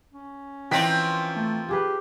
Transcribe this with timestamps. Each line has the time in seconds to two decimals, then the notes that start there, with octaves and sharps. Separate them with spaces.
0.12 C#4
0.71 E3 F3 A#3 C4 D#5 G5 B6
1.36 A3
1.69 F4 G4 G#4 B4